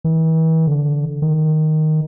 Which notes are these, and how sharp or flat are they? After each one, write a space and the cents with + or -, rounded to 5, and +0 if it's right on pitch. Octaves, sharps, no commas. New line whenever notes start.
E3 -40
D3 -15
D#3 +0